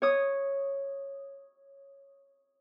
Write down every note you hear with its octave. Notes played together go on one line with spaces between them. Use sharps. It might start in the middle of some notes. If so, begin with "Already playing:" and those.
C#5 D#6